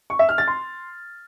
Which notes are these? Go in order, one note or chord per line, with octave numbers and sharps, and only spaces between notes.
C#6
E5
F6
A6
C6